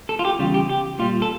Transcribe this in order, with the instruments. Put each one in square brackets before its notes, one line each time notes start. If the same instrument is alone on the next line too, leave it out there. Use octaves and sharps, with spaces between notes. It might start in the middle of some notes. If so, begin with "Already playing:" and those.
[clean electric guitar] A4
F4
G4
E2 C#3 G3 F4
G4
G4
A#2 G3 F4
A4